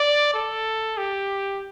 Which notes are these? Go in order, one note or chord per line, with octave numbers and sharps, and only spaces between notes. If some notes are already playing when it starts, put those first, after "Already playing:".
Already playing: D5
A4
G4